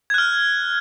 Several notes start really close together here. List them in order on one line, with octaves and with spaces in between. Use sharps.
G#6 F#6 F6